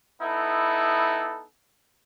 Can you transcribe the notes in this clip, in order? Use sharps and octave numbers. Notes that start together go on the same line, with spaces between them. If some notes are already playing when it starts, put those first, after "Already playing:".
B3 D#4 E4 A4